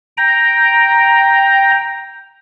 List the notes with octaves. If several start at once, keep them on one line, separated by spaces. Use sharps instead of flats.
G5 A#5